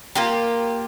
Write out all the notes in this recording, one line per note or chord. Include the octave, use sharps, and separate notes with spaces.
A#3 F4 G4